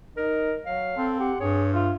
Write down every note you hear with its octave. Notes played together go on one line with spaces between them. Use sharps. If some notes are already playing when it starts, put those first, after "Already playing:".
D#4 A#4
F#3 F5
C4 A4
G4 F#5
G2 G#4 C#5
F4 E5